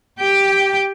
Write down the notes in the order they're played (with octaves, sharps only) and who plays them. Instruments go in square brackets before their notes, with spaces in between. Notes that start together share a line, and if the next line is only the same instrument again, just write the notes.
[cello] G4 G5